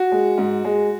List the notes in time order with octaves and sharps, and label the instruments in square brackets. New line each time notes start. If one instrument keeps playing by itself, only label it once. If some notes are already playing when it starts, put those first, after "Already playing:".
Already playing: [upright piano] F#4
G#3
G#2
G#3